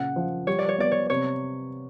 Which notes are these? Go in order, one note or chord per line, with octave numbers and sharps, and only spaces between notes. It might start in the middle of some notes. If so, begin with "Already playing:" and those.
Already playing: A#2 C#3 F#5
F3
G3 C#5
D5
C#5
B3 D5
C#5
C3 C#5